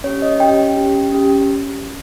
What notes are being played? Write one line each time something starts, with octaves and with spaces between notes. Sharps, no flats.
C#4 G4 C#5
D#5
C#4 G4 G5
C#4 G4
C#4 G4